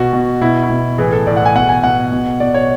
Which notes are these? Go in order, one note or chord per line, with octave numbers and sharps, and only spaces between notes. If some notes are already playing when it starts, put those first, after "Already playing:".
Already playing: B2 F#4
B2
B2 E4
E4
B2
A2 E3 G#4
A4
A2 E3 D5
F#5
G#5
B2 F#5
G#5
B2 F#5
B2
B2 D5
C#5